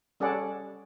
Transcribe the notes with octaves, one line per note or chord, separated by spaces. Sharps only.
G3 C#4 G#4 A4 D5 F#5